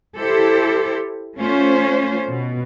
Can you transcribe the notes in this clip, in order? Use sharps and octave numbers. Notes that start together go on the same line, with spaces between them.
E4 G4 A4 C5
A3 C#4 F4 C5
B2